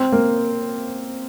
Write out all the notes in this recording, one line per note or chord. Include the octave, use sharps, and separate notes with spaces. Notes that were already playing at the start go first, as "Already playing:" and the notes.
Already playing: C4
A#3